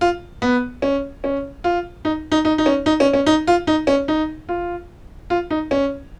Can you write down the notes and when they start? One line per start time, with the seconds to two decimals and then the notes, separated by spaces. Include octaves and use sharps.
0.01 F4
0.42 B3
0.82 C#4
1.24 C#4
1.64 F4
2.05 D#4
2.32 D#4
2.45 D#4
2.58 D#4
2.66 C#4
2.86 D#4
3.00 C#4
3.13 C#4
3.26 D#4
3.47 F4
3.67 D#4
3.87 C#4
4.08 D#4
4.49 F4
5.30 F4
5.50 D#4
5.71 C#4